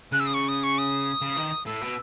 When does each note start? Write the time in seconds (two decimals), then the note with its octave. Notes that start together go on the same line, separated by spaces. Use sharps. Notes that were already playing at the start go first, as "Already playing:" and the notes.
0.12 C#3 F#6
0.20 E6
0.27 D#6
0.34 C#6
0.49 D#6
0.64 C#6
0.78 D#6
1.22 C#3
1.37 D#3
1.66 A2 E6
1.82 B2